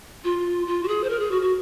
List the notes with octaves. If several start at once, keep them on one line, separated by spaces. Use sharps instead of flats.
F4
F4
F#4
G#4
C5
A#4
G#4
F#4
F#4